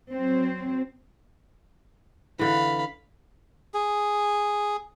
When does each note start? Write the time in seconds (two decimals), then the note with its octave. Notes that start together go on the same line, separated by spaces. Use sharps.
0.13 F#3 C4
2.39 D3 E3 F5 B5
3.74 G#4